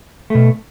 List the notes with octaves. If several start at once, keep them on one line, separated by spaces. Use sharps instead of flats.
B2 A3